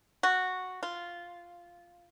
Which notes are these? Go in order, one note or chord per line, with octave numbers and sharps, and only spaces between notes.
F#4
F4